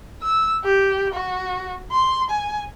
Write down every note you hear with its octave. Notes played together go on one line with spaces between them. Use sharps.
E6
G4
F#4
C6
G#5